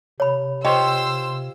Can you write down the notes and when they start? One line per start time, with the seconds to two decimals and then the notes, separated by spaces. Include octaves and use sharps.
0.20 C3 C#5 B5
0.65 F4 G4 C5 C#5 D#5 E6